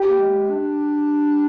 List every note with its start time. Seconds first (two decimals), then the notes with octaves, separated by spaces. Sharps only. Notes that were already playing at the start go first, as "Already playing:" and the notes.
Already playing: G4
0.09 A#3
0.20 G#3
0.51 D4